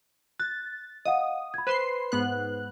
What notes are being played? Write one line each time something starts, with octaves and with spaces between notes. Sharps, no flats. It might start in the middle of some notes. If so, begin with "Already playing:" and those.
F#6 A6
D#5 F5 F#5 D#6
B5 G#6
B4 C5 B5 C6 C7 E7
G#2 B3 F#6